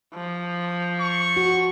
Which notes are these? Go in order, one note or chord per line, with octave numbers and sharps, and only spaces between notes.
F3
C#6
F#4